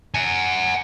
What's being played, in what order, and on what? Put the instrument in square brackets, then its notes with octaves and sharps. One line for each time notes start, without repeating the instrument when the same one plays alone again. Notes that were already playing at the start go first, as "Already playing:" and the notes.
[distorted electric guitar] F#5 G#5